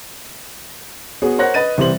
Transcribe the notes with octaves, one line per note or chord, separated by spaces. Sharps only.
B3 F#4 G#4 C#5
A#4 C5 C#5 F#5 F#6 A#6
B4 D#5 A6 D#7
C2 E3 G3 C5 F#7